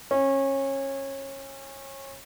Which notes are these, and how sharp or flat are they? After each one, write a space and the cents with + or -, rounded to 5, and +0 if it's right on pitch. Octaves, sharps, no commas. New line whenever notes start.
C#4 -25